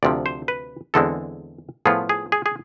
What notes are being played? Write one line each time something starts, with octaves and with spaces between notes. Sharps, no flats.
D2 C3 F3 D5
C5
B4
E2 D3 G#3 C4 A4
A2 F3 B3 F4 G#4
G#4
G#4
G#4